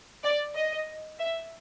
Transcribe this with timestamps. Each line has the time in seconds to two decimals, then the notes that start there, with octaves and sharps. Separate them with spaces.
0.23 D5
0.55 D#5
1.19 E5